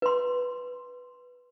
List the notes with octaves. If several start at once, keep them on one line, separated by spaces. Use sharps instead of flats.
B4 C6